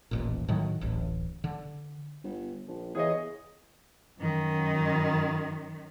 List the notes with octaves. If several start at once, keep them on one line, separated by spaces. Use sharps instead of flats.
D#1 A1 A#2
A2 D#3 F#3
D1 A1
D3
G1
A#1
E2 G#4 C#5 D#5
F#2 D#3